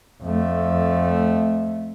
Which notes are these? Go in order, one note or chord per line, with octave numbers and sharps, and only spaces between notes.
F2 A3